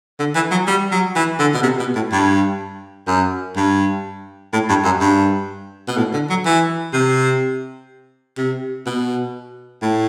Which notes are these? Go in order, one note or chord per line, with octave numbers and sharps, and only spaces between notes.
D3
E3
F#3
G3
F#3
E3
D3
B2
C3
B2
A2
G2
F#2
G2
A2
G2
F#2
G2
B2
A2
D3
F#3
E3
C3
C3
B2
A2